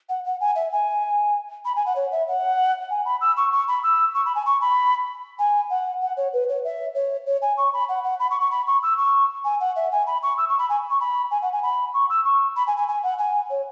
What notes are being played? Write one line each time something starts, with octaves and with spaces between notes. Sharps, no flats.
F#5
F#5
G#5
E5
G#5
B5
G#5
F#5
C#5
E5
F#5
G#5
B5
E6
C#6
C#6
B5
E6
C#6
B5
G#5
C#6
B5
G#5
F#5
F#5
C#5
B4
C#5
E5
C#5
C#5
G#5
C#6
B5
F#5
F#5
B5
C#6
C#6
B5
C#6
E6
C#6
G#5
F#5
E5
G#5
B5
C#6
E6
C#6
B5
G#5
C#6
B5
G#5
F#5
G#5
B5
C#6
E6
C#6
B5
G#5
G#5
G#5
F#5
G#5
C#5